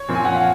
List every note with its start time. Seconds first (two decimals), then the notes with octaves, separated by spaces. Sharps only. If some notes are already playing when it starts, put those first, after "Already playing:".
Already playing: C#5
0.08 A#2 F3 C4
0.15 G#5
0.25 F#5
0.35 F5